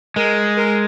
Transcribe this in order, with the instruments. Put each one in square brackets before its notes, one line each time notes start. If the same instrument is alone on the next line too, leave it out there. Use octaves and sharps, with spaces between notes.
[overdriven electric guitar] G#3 [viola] A#4
[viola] A#4